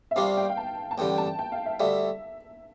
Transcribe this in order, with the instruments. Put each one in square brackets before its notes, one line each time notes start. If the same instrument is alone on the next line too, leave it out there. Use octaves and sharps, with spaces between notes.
[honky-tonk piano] E5
[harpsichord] C2 C3 G3 D4 F4 [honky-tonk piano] F5
[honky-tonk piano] G5
G5
A5
A5
[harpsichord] A1 G2 D3 G3 [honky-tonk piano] G5
[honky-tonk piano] A5
G5
F5
E5
[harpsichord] D2 D3 G3 [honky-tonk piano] E5